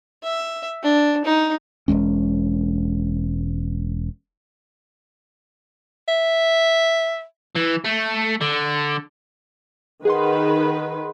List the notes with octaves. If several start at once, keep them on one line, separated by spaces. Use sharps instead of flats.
E5
D4
D#4
E1 E2 G#3 C#4
E5
E3
A3
D3
D#3 G#4 B4 F#5 C6